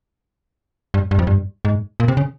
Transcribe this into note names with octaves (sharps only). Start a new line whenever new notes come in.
G2
G2
F2
G2
G#2
A#2
C3
C#3